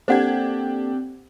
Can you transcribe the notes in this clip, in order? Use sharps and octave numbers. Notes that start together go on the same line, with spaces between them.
A#3 C4 D4 G4 A4 C5 F#5 G#6